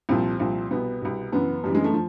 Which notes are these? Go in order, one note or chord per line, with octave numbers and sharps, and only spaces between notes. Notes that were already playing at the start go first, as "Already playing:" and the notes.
C2 A#2 F3 C4
C2 A#2 F3
C2 B2 B3
C2 B2
F#2 C#3 E3 B3
F#2 C#3 E3 G3
G#3
A3
F3